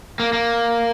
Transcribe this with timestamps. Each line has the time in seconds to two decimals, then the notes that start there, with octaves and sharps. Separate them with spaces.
0.20 A#3
0.33 A#3